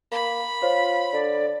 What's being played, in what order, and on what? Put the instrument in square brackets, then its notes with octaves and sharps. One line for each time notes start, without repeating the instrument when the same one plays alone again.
[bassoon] A#3 [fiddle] B5
[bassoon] F4 [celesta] C5 C#5
[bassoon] D3 [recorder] D5